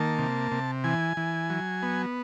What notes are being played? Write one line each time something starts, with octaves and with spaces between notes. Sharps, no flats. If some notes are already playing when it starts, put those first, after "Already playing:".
Already playing: D#3 A#3 A5
C3
C3
E3 G#5
E3
F#3
B3